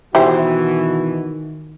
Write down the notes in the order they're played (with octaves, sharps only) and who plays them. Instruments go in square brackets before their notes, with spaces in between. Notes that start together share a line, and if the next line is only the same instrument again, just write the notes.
[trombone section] B2 E3 F#4 [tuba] D#3 [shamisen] E4 G4 C5